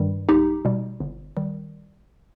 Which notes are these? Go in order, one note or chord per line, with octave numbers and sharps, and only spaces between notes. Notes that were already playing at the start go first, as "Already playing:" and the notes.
Already playing: G2 D#3 G3
B1 D#4 G4
B2 G3
G1
D#3 G3